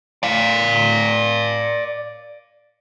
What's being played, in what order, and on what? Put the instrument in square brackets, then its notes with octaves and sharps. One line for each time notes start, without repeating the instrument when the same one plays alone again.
[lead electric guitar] D5 F5